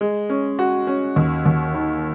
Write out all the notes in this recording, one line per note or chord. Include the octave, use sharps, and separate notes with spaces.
G#3
C#4
F#4
C#4
D#2
D#2
D#3